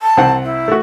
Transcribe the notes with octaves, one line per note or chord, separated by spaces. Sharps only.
A5
C2 C4 F#5
E4
A3 F#4